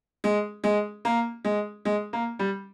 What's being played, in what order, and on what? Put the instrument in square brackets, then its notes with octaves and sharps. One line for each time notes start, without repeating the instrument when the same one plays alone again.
[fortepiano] G#3
G#3
A#3
G#3
G#3
A#3
G3